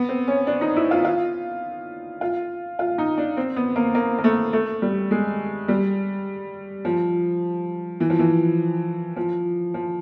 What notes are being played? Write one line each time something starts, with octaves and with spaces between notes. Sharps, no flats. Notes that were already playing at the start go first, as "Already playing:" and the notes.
Already playing: B3
C4
C#4
D4
D#4
E4
F4
F4
F4
F4
D#4
D4
C4
B3
A#3
A#3
A#3
A3
A3
G3
G#3
G3
F3
E3
F3
E3
F3
F3